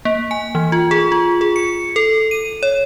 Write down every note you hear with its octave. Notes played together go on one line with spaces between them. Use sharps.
A#3
G#5
E3
F4
G#4
F4
G#4
C#7
A4
D#7
C#5